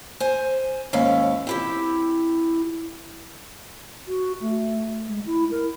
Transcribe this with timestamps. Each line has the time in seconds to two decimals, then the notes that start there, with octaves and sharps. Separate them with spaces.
0.20 C5 G#5
0.93 D#2 G#2 C#4 E4 F5
1.47 C4 E4 G4
4.07 F#4
4.41 A3
5.08 G#3
5.26 E4
5.51 A#4